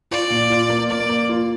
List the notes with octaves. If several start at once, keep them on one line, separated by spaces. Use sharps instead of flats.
F4 D5
A#2
F4
A#3
A#3 D5
A#3
F4